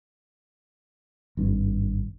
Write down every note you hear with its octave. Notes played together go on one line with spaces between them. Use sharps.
G#1 G2